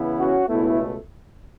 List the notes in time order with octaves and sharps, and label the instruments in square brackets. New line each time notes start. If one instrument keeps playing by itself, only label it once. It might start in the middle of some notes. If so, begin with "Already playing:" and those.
Already playing: [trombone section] C#3 E3 B3 E4
[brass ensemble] C#4 F#4
[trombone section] C#2 B2 A3 [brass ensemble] B3 E4